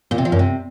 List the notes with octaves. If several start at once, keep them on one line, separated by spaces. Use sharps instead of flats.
A#2
C3
F3
F#2
C3